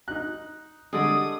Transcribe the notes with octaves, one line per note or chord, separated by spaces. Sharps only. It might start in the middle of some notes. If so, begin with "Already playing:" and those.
D#4 F#6
D3 G3 G#3 A4 D5 D#6